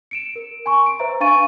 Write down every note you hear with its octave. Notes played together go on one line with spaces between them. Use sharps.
C#7 D7 E7
A#4
G#5 C6 C#6
D7
B4 C5 E5 A#5
D4 F5 G#5 C#6 A6 D#7